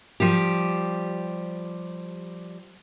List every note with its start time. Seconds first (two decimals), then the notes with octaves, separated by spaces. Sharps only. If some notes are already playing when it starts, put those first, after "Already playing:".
0.20 F3 G3 G4